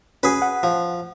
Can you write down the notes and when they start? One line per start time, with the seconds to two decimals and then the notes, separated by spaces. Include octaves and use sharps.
0.23 C#4 F#4 G#4 B4
0.42 F#5
0.63 F3